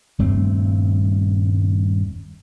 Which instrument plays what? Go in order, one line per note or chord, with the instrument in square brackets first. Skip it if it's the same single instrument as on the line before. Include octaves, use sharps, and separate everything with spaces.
[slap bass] D#1 G2 A3 C4